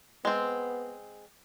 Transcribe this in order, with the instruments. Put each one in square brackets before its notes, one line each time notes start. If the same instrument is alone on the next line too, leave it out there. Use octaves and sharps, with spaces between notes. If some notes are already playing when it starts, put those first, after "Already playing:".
[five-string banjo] G#3 C4 [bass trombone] B3